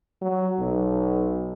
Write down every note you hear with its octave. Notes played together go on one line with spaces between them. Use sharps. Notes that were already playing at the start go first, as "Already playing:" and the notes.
F#3
B1